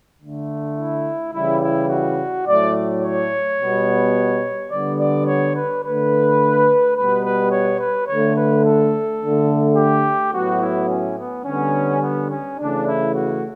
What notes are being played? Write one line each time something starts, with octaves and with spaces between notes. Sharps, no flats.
D3 A3
E4
C#3 E3 G3 E4
E4
F#4
A2 F#3 A3 D5
C#5
B2 G3 B3
D3 G3 B3 D5
D5
C#5
B4
D3 A3 B4
B2 G3 B3 B4
B4
C#5
B4
D3 A3 C#5
B4
A4
D3 A3
G4
A2 F#3 B3 F#4
E4
C#4
B3
D3 G3 B3 C#4
B3
C#4
C#3 E3 A3 D4
E4
F#4